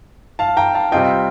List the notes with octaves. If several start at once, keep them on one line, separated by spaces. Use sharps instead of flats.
F5 A5
G5 A#5
F5 A5
C3 G3 C4 F4 D#5 G5